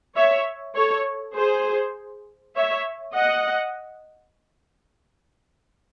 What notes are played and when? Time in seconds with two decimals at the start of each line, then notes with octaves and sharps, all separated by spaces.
0.16 C#5 E5
0.76 A4 C#5
1.36 G#4 C5
2.56 C#5 E5
3.16 D#5 F#5